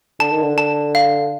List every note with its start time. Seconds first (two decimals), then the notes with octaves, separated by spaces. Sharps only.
0.19 D3 A5
0.32 D#3
0.43 D3
0.58 A5
0.95 F5